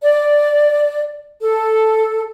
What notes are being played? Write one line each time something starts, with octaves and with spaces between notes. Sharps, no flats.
D5
A4